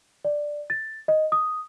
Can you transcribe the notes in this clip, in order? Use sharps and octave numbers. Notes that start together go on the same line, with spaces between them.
D5
A6
D#5
D#6